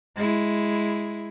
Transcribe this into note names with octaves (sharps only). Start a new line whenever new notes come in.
G#3 E4